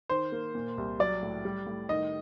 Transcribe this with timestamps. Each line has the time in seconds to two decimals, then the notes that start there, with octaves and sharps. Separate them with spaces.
0.10 D#3 C5
0.32 A#3
0.55 A#2
0.78 C2
0.99 F#3 D5
1.23 A2
1.45 G3
1.67 A2
1.89 D#3 D#5